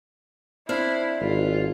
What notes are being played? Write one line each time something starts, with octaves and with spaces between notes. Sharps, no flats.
C4 D4 E4 F5
G#1 F4